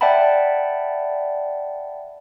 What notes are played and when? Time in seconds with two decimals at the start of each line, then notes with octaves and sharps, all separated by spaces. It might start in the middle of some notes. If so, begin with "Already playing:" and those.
0.01 D5 E5 F#5 G5 A5 B5